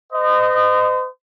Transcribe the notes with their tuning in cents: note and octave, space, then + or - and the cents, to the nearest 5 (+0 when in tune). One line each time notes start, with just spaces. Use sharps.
C5 -40 D#5 -20